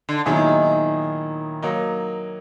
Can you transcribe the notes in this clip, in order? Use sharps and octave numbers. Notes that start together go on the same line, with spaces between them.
D3
A#2 D#3 F#3 B3 E4 G#4
F#3 A#3 D#4